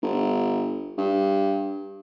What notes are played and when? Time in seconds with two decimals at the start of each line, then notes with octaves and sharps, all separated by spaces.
0.03 G1
0.98 G2